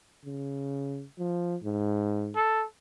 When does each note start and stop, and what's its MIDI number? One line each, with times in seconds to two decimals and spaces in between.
0.25 1.05 49
1.19 1.56 53
1.64 2.35 44
2.36 2.64 69